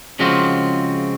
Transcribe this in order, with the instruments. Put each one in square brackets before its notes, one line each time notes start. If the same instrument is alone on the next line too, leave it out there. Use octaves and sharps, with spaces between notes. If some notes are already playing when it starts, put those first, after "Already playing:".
[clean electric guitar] C#3 F3 G#3 C4 F4 F#4